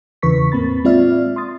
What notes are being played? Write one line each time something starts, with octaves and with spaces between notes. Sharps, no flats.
E2 C#3 E3 B4 C#6 B6
A2 A#3 C4 B5 A6
G#3 C4 F4 D5 E5 F6
C6 D#6 A6